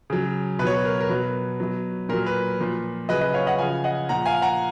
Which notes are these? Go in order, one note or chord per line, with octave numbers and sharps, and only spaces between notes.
C#3 F#3
B2 F#3 B4 C#5
B4
A#4
A#4
B2 F#3 B4
B2 F#3
A#2 F#3 A#4
B4
A#2 F3
C#3 F#3 B4 D#5
B4 D#5
C#5 F5
D#5 F#5
C#3 F3 F5 G#5
D#5 F#5
A#2 F3 F#5 A#5
F5 G#5
F#5 A#5